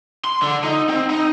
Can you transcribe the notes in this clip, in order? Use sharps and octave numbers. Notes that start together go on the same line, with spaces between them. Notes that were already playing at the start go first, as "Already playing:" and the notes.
C6
D3
D#4
C4
D#4